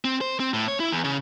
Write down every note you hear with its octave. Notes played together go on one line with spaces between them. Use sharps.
C4
C5
C4
A2
C#5
E4
E2
C#3